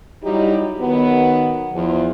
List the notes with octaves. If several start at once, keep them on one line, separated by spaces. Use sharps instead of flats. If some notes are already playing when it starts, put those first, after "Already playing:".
F#3 G3 D#4 E4 G4
D#3 F#3 B3
E2 F3